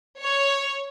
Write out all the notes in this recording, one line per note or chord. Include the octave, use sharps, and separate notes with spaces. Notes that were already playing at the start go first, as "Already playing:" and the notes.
C#5